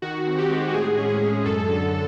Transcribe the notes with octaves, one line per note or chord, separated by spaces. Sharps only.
D#3 F#4
C4
G4
G#3
G4
A2 G#4
C#4
G#4
G#3
F#2 A4
D3